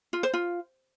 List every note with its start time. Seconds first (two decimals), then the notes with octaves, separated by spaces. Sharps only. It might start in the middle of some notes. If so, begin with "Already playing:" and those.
0.13 F4
0.23 C5
0.34 F4